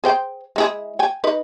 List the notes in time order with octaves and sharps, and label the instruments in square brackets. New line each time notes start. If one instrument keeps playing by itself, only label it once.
[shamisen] G#4 C5 G5
G#3 E4 G#4
G5 G#5
D#4 B4 D#5